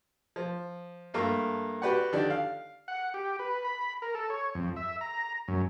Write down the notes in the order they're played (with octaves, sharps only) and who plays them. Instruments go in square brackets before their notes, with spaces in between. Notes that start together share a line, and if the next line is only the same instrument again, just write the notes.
[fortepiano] F3
G2 A3 A#3 A#4
F#4 G4 B4 D5 F#5
D3 D#3 D4 G4 D5
F5
[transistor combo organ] F#5
G4
B4
B5
A#4
A4
C#5
F2
E5
A#5
F#2